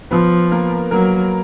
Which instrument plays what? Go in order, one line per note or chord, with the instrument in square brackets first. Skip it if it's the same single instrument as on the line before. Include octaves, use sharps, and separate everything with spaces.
[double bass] F3 [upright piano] B3 B4
[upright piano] A#3 A#4
[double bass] F#3 [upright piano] A#3 A#4